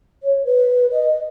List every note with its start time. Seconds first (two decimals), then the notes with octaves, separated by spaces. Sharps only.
0.23 C#5
0.45 B4
0.91 D#5